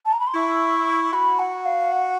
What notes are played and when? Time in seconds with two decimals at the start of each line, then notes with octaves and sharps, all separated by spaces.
0.05 A5
0.12 A#5
0.19 B5
0.27 C6
0.35 E4 C#6
1.13 F#4 B5
1.39 F#5
1.65 F5
1.92 F#5